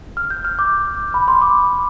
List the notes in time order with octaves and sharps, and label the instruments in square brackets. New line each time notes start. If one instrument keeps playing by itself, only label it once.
[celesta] F6
G6
F6
D6
B5
C6
D6